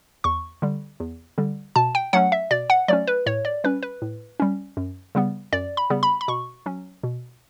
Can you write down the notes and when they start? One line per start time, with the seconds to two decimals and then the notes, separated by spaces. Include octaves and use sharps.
0.24 E2 C#6
0.62 D3 G3
1.00 E2
1.38 D3 G3
1.76 B2 A5
1.95 G5
2.13 F#3 A3 C#4 F#5
2.32 E5
2.51 B2 D5
2.70 F#5
2.88 F#3 A3 C#4 D5
3.07 B4
3.26 A2 C#5
3.45 D5
3.64 G3 C#4 B4
3.83 B4
4.02 A2
4.40 G3 C#4
4.77 F#2
5.15 C#3 G3 B3
5.52 F#2 D5
5.77 B5
5.90 C#3 G3 B3
6.03 B5
6.21 B5
6.28 B2 C#6
6.66 F#3 C#4
7.03 B2